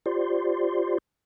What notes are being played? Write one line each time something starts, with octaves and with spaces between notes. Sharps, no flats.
F4 G4 C5 D5 C6